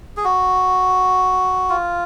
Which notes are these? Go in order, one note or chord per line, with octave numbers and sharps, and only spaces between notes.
G#4
F#4
F4